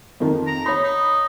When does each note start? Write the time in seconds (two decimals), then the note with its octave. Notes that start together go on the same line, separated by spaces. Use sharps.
0.20 F2 D#3
0.47 A#5
0.66 D#4 C#5 B5
0.83 D#4